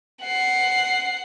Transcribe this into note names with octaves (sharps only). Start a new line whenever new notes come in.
F#5 C7